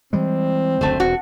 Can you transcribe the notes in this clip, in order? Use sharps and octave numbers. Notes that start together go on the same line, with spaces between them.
E3 G3 G#3 C4
F#1 D2 A3 C5
E1 F#4